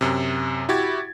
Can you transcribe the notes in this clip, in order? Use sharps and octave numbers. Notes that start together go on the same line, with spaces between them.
F#2 C3
E4 F#4 G4 G#6 A6